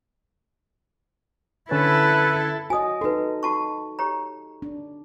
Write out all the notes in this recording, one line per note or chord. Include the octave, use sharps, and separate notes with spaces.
D3 C#4 E4 A4 B4
F#4 C#5 D#5 G#5 D#6
D#4 F#4 A4 B4
F#4 A5 C#6
G4 C#5 A#5
D4